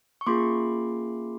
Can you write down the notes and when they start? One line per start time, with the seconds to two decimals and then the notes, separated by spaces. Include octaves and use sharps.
0.21 C#6
0.27 A#3 C#4 F4 G#4 C6 D6